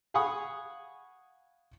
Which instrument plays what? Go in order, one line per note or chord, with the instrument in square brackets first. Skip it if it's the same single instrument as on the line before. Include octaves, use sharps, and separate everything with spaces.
[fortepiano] F5 F#5 G#5 B5 C#6 D#6